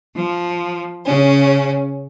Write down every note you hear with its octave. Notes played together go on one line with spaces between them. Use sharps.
F3
C#3 C#4